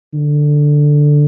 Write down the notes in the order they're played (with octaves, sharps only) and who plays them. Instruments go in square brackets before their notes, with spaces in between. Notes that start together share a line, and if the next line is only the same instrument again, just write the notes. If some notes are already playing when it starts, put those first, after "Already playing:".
[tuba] D3